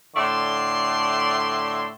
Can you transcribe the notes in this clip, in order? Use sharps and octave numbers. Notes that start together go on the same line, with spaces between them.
A2 D3 D5 E5 C6